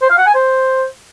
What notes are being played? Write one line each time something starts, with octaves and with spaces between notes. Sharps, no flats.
C5
F5
F#5
G#5
C5